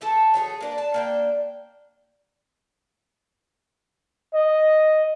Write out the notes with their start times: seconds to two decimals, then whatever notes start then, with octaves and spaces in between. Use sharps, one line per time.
0.01 E3 A3 A4 A5
0.34 F#3 A3 D#4 G#4
0.61 A#3 D4 B4
0.78 A5
0.94 A#3 D4 G5
4.34 D#5